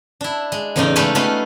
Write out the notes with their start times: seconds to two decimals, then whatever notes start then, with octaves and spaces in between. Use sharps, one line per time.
0.21 D4 E4
0.52 G#3
0.76 E2 A2 C#3 C#4 D#4 D5
0.96 G#3 A3 F4 G4 B4 C#5
1.15 A3 B3 C#4 F4